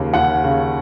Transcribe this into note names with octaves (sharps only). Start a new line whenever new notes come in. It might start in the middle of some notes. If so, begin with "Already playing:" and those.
Already playing: D#2 C#3
D#2 F#5
C#3